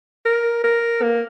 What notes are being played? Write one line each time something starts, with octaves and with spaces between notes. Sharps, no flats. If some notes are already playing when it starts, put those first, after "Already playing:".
A#4
A#4
A#3